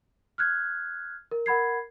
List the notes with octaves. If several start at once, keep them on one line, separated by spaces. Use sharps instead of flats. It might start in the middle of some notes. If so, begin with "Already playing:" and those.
F6 F#6 G#6
A#4
A#4 F#5 B5 G#6 C7